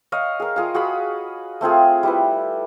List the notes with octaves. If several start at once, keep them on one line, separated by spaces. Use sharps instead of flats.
C#5 D#5 F5
G#4 A#4
F4 G#4 F5
F#4 G#4 F5 B5
A3 C4 F4 G#4
G3 E4 B4